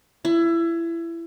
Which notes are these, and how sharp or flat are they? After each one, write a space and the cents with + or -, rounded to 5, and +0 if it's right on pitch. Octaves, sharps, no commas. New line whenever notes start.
E4 +25